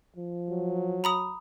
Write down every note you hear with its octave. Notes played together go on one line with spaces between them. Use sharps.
F3
F#3
A#5 B5 D#6